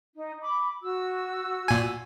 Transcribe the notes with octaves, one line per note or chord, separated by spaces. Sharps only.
D#4
B5 D6
F#4 E6
A#2 G#5